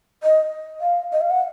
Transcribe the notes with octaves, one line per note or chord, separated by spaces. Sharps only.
D#5
F5
D#5
F5
F#5